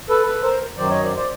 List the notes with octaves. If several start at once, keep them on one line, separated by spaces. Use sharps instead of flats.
A4 B4
A4 B4
A#4 C5
F#2 D#3 F#3 C5 D5
C#5 D#5
C5 D5
C5 D5